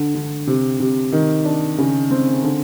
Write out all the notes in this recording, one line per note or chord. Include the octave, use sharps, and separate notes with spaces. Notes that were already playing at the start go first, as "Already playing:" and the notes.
Already playing: D3
D3
C3
C3
D#3
D4
C#3
C4
D3